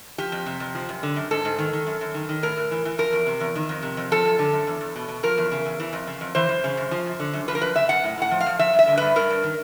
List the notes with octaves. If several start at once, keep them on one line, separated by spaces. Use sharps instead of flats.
F3 G4
F2
C3
F2
F3
F#2
D3
F#2
G#2 A4
G#2
D#3
D#3
F#2
F#2
D#3
D#3
A2 A#4
A2
E3
E3
F3 A#4
E2
C3
E2
D#3
F2
C3
F2
F3 A4
F#2
D3
F#2
E2
E2
B2
B2
F3 A#4
E2
C#3
E2
E3
F2
C#3
F2
E3 C5
F#2
C#3
F#2
F3
F#2
D3
F#2
F3 B4
A#4
F#2 B4
C#3 E5
F#2 F#5
A2
A2 F#5
F3
F5
F3
F3 E5
G2
E5
D3
G2 B4
G2 A#4
G2
D#3